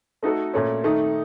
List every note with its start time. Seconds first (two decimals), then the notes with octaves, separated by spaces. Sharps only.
0.23 A3 D#4 F#4 A4
0.54 A#2 A3 C#4
0.83 D#3 A3 D#4